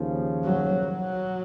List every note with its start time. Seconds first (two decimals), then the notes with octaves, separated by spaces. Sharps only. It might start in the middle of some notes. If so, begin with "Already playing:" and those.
Already playing: D#2 C#3 F3
0.44 F#3
0.86 F#3